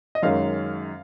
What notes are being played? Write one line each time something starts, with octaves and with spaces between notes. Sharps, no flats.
D#5
F#2 D#3 G#3 C#4 F5